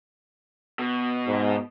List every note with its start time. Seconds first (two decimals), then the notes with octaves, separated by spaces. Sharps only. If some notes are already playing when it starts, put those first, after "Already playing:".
0.79 B2
1.27 G#2